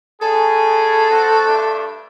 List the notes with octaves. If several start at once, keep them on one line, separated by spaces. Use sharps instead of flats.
C#3 G#4 A4
C4 F#4
G2 A3 D4